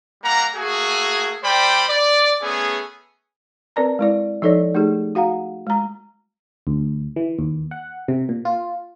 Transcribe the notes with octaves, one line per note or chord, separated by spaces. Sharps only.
G3 A#3 F#5 A#5
A3 A#3 F#4 G#4
G3 C5 D5 G5 B5
D5
A3 B3 C#4 G#4
C4 A#4 B4 D5 A5 A#5
G#3 E4 D5
F3 D#4 A4 C#5 D5
A3 D#4 G4 G#4
F#4 F5 F#5 A#5
G#3 A#5
D2
E3
D#2
F#5
C3
A#2
F4